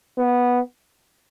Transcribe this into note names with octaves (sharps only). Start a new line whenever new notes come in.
B3